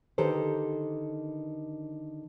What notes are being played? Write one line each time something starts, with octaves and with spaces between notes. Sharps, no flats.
D3 D#3 G4 A4 B4 C5